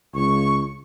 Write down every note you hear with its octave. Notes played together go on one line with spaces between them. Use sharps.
C#2 C#6